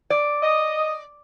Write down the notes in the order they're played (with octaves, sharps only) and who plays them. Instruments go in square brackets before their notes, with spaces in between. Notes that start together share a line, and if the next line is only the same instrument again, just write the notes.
[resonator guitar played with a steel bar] D5
[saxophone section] D#5